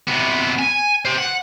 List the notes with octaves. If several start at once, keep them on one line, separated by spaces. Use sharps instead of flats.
C3 B3
G#5
G4 C5
F#5